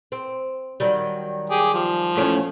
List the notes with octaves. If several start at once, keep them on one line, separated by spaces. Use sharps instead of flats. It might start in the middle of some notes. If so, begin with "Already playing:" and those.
C4
D#3 F#3 G3
G4 G#4
F3
E2 A3 C#4